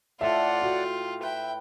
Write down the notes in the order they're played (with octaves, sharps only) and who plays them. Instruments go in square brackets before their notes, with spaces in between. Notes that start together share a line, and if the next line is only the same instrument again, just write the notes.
[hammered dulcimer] A2 [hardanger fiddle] F4 [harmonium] D5 F#5 [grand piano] E5
[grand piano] F#4 [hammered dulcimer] E5 G5
[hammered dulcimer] B4 [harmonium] E5 [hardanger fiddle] G5